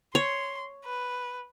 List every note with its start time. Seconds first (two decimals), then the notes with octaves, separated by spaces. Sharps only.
0.15 C#5 C6
0.85 B4